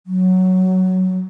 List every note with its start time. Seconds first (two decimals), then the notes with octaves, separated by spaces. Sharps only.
0.07 F#3